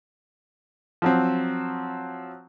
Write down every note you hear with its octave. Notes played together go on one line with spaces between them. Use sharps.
F3 F#3 C4